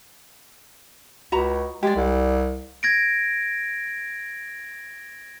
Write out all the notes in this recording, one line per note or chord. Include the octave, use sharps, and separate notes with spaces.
C#2 F#4 A#5 B5
G#3 G4 D5
C2
G#6 A#6 D7